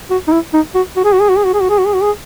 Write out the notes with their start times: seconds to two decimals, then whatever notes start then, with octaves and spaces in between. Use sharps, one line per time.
0.10 F#4
0.28 D#4
0.32 E4
0.53 D#4
0.75 F#4
0.97 F#4
1.05 G#4
1.13 F#4
1.21 G#4
1.29 F#4
1.38 G#4
1.45 F#4
1.54 G#4
1.62 F#4
1.70 G#4
1.78 F#4
1.86 G#4
1.94 F#4
2.03 G#4